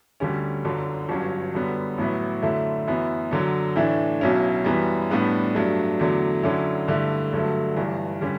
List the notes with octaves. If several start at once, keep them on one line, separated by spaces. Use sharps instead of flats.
D2 D3 G3 C#4
G1 F#2 D3
G1 G2 F#3 C#4
F#2 D3 G3 B3
A1 A2 F#3 B3 E4
F#2 D3 A3 E4
F#2 E3 B3 E4
F#2 D3 F#3
A2 E3 A3 D4
B1 B2 F#3 C#4 E4
F#2 E3 G3 B3
A2 G3 B3 D4
G2 F#3 A3 D4
E2 D3 F#3 A3
F#2 D3 F#3 C#4 E4
G2 D3 A3 E4
G2 D3 F#3 A3
G1 G2 E3
D3 G3 C#4